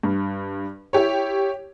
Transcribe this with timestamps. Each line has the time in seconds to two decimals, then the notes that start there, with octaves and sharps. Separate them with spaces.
0.03 G2
0.93 E4 G4 C#5